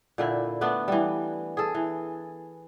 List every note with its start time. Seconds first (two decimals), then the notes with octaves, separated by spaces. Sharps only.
0.18 A#2 D3 E4
0.61 A3 B3 D4
0.88 E3 G3
1.57 G#4 A4
1.75 E3